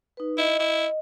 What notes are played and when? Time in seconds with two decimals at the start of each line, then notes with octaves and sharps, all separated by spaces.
0.17 D#4 B4
0.38 E4 D#5
0.59 E4